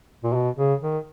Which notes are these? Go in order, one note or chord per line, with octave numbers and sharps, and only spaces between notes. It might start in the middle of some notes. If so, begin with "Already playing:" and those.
A#2
B2
C#3
D#3